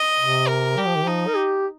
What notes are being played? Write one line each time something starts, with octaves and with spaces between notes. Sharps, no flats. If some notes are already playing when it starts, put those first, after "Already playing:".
Already playing: D#5
C3
A#4
G3 G4
F3
D#3
F3 D#4
A#4
G4